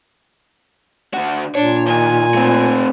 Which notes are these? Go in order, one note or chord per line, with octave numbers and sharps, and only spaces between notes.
D3 F#4
A#2 D4 C#5
D#2 G#5
A3 C4